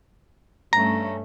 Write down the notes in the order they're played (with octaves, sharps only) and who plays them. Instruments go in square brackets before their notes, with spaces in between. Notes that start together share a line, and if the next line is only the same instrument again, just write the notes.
[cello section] G2 A3 C#4 [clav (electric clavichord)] A#5